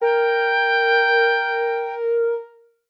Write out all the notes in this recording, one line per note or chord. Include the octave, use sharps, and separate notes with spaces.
A#4 G5